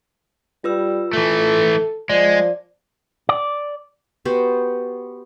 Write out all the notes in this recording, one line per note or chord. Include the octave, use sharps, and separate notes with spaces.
G3 F4 B4 E6
E3 A3 A4
F3 G#3 D5
D5
B3 F#4 G4 C5